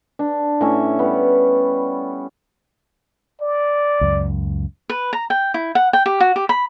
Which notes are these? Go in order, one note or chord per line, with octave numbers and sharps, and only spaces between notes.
D4
A2 C#4 E5
G3 B3
D5
C#2 F#2
B4
A#5
G5
E4
F#5
G5
G4
F#4
G4
B5